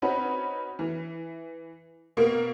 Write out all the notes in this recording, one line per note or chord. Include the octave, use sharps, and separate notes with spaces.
C4 C#4 D#4 F#4 B4
E3
B2 A#3